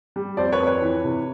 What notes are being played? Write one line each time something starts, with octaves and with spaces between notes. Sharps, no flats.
G3
F2 C5 D5
B4 C#5
F2
B4 C#5
E3
C3